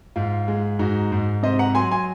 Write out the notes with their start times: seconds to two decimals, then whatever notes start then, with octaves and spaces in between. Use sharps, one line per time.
0.16 G#2 F4
0.48 G#3
0.79 G#2 D#4 F#4
1.12 G#2
1.43 C3 C5 D#5
1.59 F#5 A#5
1.75 F#3 G#5 C6
1.91 G#5 C6